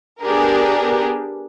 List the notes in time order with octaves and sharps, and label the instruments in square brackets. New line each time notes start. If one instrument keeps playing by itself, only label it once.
[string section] B3 D4 G4 G#4 A#4